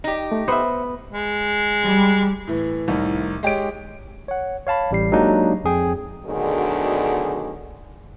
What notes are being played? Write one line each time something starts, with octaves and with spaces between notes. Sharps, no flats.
D#4 G4
A3
B3 C5 E5
G#3
G3
A2 E3
C2 A2 D#3
G#3 G4 C#5 D7
C#5 F#5
C#5 F5 A5 B5
A1 G3 C7
F#3 G#3 A#3 D4 D#4 G4
F2 G#4 G5
D2 B2 D3 D#3 F#3 G#4